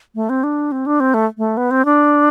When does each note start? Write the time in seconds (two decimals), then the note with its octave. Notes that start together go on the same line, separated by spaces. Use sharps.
0.15 A3
0.29 C4
0.44 D4
0.72 C4
0.86 D4
1.00 C4
1.14 A3
1.38 A3
1.57 B3
1.71 C4
1.85 D4